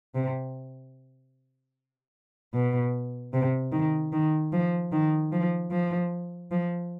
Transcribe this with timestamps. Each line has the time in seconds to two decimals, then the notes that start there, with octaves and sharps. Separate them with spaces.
0.15 C3
2.54 B2
3.33 C3
3.72 D#3
4.12 D#3
4.52 F3
4.92 D#3
5.32 F3
5.71 F3
6.51 F3